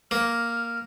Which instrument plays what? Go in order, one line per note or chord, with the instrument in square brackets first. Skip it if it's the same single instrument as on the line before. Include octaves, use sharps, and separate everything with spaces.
[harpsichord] A#3 [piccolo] F6